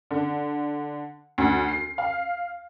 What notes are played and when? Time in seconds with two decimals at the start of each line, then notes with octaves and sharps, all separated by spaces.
0.11 D3
1.38 D2
1.68 C7
1.98 F5